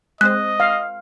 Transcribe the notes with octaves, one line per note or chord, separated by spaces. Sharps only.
G#3 C4 C5 D#5 F#6
F5